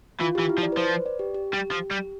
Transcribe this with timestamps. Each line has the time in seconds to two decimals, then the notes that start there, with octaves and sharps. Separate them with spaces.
0.21 E3 F4
0.35 E3 G4
0.49 E4
0.58 F3
0.63 D5
0.72 B4
0.77 F3 C5
0.91 B4
1.06 D5
1.19 G4
1.35 G4
1.53 G3
1.71 F3
1.91 G3